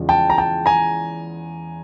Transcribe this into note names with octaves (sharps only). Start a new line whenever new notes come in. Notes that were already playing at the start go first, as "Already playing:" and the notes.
Already playing: E2 C#3 F3 G#3
G5 A5
A#5
G5 A5
G#5 A#5